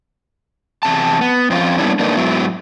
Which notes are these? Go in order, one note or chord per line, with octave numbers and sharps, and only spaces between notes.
E2 C3 A5
B3
F2 C4 C#4 F4
G3 A#3 B3 C#4 D4 E4
D3 A#3 D4 D#4 A#4 B4
G#2 F#3 B3 E4